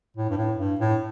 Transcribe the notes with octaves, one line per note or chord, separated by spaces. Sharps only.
A2
G2
A2
G2
A2